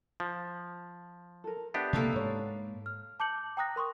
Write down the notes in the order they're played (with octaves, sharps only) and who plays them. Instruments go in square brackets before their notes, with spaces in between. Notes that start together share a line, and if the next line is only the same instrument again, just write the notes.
[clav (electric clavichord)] F3
[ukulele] A4 A#4
[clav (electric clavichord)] B3 D4 G4 [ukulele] E5
[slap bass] C3 A3 [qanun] A#3 A4 F5
[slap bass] G#2 [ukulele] C#5
[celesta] F6
A5 D6 G6 C#7 F#7
G5 A#5 D#6 F#6 A#6
A#4 C6 C#6 D#6